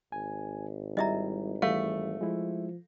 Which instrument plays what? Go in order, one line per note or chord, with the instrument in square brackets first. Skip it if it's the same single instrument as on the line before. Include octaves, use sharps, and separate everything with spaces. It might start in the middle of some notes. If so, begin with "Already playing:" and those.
[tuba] G#1 [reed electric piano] G#5
[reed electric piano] G3 E4 [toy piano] D#5 E5 A#5
[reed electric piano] E3 G3 [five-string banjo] A3 [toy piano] F5
[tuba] F3 [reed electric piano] G#3 E4